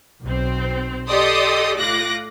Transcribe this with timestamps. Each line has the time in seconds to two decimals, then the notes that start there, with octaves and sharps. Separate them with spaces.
0.23 B1 C4
1.09 G4 A4 D5 D#5 C6 D#6
1.78 A2 F4 D6 F#6 A#6